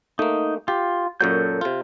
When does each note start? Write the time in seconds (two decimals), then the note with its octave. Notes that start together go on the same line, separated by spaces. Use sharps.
0.19 A3 A#3 D#4
0.68 F4 G4
1.21 F#2 A#2 F#3 A4 G6
1.61 C3 F4